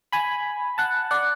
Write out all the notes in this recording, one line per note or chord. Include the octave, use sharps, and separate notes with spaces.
G#5 B5
F#5 A5
D5 F#5